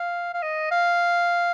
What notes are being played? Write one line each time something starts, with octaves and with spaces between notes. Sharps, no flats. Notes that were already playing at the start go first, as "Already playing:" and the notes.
Already playing: F5
F5
D#5
F5